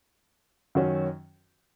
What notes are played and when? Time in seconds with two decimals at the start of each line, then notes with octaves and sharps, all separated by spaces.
0.75 F#2 D#3 F#3 C#4 F#4